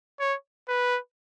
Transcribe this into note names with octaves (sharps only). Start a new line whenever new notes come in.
C#5
B4